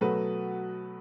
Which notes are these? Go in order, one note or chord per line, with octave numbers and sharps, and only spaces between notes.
B2 F#3 A3 F#4 B4